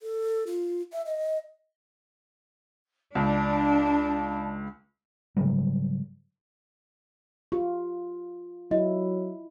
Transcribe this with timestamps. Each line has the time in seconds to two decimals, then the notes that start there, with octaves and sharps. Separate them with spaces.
0.02 A4
0.47 F4
0.92 E5
1.06 D#5
3.15 C#2 D4 A5
5.37 G#2 C#3 F#3 G3
7.52 F4 G4
8.71 F#3 E4 D#5